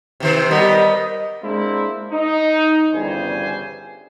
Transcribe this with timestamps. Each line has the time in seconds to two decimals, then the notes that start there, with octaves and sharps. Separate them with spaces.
0.20 C3 D#3 C5
0.51 G3 B3 G4 A#4 D#5
1.42 G#3 A#3 C4 D4 E4
2.12 D#4
2.92 G1 E2 C#3 G3 C5 G#5